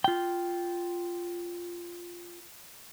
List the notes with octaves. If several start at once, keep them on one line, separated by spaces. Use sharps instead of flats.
F4 G5